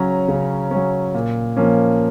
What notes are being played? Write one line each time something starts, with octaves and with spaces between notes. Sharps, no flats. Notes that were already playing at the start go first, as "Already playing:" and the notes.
Already playing: C#3 F#3 C#4 A#5
C#3
F#3 C#4
A#2
F3 A#3 C#4